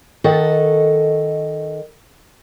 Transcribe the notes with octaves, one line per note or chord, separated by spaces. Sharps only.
D#3 A4 D#5 F#5